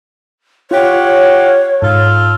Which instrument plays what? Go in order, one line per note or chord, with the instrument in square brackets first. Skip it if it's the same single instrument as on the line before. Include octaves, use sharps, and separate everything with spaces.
[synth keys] F4 [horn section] G4 F5 F#5 [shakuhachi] C#5
[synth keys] G#2 [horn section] F4 A4